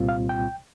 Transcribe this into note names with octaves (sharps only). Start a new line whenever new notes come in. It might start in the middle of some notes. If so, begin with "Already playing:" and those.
Already playing: C2 A#2 G3 C4 F4
F5
G5